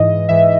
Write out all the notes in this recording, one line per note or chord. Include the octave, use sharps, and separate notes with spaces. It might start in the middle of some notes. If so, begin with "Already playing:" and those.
Already playing: G#2 E3 D#5
G#2 E3 E5